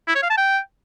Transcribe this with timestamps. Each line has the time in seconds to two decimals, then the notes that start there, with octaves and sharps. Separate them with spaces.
0.08 E4
0.15 C#5
0.23 F5
0.30 A5
0.37 G5